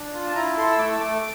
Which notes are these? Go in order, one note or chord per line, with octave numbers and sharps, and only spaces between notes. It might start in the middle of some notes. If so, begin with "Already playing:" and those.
Already playing: D4
F4
A5
E4 A#5
A4 C6
E6
A3 D6
E6
A3 D6